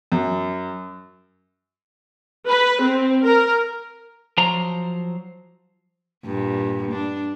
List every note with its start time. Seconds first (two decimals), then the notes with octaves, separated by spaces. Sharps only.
0.12 F#2
2.47 B4
2.82 C4
3.25 A#4
4.37 F3 F#3 C5 A#5
6.26 G2 A#2
6.92 D4